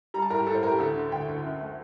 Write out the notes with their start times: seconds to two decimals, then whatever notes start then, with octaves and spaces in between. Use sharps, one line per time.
0.14 G3 A#5
0.22 A5
0.30 A2 A#4
0.38 G4
0.47 A2 A4
0.54 C5
0.63 A2 A#4
0.71 G4
0.79 D2 A4
0.95 D3
1.12 D2 G5
1.28 D2
1.44 F#2
1.61 A3